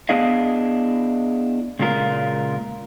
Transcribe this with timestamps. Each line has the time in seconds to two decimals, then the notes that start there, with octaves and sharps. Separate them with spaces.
0.09 B3 D4 E4 G#4 D#5 F5
1.79 A#2 C#3 G#3 F4 A#4